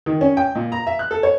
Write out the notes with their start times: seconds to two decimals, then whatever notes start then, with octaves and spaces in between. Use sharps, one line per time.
0.06 D#3
0.21 C#4
0.37 G5
0.55 A#2
0.72 A#5
0.87 E5
0.99 F#6
1.11 A4
1.23 C#5